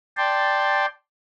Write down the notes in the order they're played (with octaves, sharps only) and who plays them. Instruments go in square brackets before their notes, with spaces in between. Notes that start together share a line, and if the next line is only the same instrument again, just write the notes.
[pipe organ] D5 G5 A5 C6